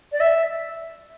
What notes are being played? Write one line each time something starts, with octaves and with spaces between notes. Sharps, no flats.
D5
E5